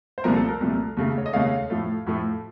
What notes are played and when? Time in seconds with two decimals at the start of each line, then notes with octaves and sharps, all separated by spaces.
0.18 C5
0.24 C2 A#2 F3 A3 A#4
0.36 A4
0.49 A#4
0.61 C2 A#2 F3 A3
0.97 D#2 C#3 A3
1.18 C#5
1.26 D#5
1.33 D#2 C#3 A3 C#5 F5
1.70 A2 F3 A3
2.07 A2 F3 A3